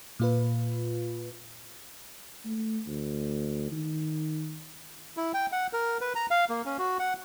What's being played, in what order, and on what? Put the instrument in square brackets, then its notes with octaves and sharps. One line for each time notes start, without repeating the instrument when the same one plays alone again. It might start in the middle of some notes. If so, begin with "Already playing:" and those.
[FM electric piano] A#2 F4 B4
[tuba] A3
D2
D#3
[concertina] E4
G5
F#5
A#4
B4
A#5
F5
A#3
C#4
F#4
F#5